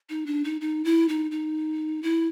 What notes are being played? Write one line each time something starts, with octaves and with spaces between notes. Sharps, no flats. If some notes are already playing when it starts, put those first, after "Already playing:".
D#4
D4
D#4
D#4
E4
D#4
D#4
E4